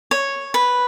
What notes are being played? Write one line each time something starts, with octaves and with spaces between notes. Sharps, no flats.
C#5
B4